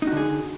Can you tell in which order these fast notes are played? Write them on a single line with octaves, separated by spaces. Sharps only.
D#4 F#4 D3 G#4